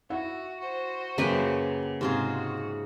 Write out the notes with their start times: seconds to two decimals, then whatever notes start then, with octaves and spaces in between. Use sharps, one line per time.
0.10 E4 F#4 E5 F#5
0.60 F#4 C5
1.18 F#2 C#3 F#3 A#3 G4 B4 G5
2.01 G#2 C3 F4 F#4 G#4